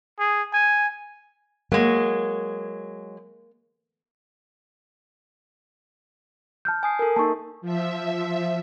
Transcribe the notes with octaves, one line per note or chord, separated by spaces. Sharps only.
G#4
G#5
F#3 G#3 A#3
A5 F6 G6
G#5 D#6 C7
A4 A#4
A#3 D#4 A5 C#6
F3 E5